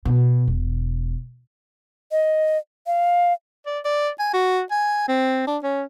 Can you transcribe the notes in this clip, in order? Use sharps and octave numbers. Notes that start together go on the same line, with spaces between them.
B2
E1
D#5
F5
D5
D5
G#5
F#4
G#5
C4
D4
C#4